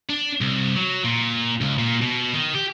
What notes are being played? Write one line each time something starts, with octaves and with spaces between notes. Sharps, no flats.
D4
C2
F#3
A#2
C#2
A#2
B2
D#3
G4